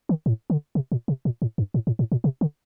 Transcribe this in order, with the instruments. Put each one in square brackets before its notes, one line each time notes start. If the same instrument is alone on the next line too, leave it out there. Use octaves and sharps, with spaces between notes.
[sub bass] D#3
A2
D3
C3
A#2
C3
A#2
A2
G2
A2
A2
A2
A#2
C3
D3